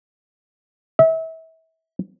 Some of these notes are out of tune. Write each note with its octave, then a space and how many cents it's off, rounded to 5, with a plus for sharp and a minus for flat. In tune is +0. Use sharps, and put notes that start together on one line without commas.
E5 -30